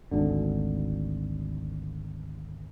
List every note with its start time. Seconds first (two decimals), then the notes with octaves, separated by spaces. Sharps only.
0.11 G#1 D2 D3